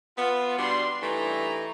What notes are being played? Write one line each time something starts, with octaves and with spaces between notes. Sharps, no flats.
B3 F4
B2 G3 D4 C6
G2 E3 A3 D#4 E4 A#5